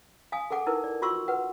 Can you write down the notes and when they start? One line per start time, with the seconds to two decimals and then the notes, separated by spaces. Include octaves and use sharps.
0.32 F5 G#5 D#6
0.50 G#4 A4 F#5 D6
0.66 D#4 E4 A#4 B4
0.84 D5
1.02 F4 F#4 C6 C#6 E6
1.28 B4 F#5